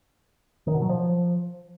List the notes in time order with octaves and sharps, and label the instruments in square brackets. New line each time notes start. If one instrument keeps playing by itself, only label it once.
[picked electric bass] D#3
B2
F#3
F3